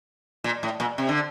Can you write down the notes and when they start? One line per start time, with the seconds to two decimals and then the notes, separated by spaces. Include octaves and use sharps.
0.44 A#2
0.63 A2
0.80 A#2
0.98 C3
1.09 D3